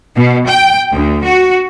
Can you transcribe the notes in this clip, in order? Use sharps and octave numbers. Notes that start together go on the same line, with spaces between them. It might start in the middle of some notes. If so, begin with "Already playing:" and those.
B2
G5
D2
F#4